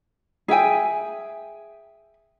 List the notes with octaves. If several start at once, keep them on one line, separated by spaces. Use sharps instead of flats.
G#4 E5 G5 G#5